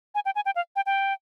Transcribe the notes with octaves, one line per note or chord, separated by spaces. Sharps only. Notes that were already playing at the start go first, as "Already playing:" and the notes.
G#5
G5
G#5
G5
F5
G5
G5